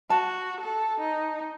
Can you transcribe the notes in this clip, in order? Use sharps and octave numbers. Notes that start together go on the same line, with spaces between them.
F#4 A5
A4
D#4